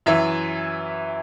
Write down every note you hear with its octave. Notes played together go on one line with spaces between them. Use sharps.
F#2 E3 E5